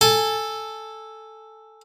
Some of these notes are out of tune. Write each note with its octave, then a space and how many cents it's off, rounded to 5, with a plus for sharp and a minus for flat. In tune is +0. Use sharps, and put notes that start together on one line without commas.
A4 +0 G#5 -10